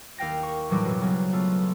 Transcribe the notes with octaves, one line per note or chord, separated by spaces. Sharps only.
D#2 F5 G5 A#6
C#6
A2 E3 F#3 G3 D4
F2 B2
B1 C#3 F#3
A3 B3 F4